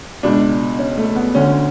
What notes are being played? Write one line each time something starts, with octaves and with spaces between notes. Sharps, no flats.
C#2 B2 D4
C#4
A3
B3
D2 D3 C#4